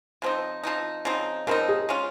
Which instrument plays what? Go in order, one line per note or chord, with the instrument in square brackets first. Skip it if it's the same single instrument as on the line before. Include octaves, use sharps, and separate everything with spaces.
[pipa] C#3 F3 C4 D#4
C#3 F3 C4 D#4
C#3 F3 C4 D#4
[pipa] C#3 F3 C4 D#4 [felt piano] A#4
[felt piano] G#4
[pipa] G#3 C#4 F4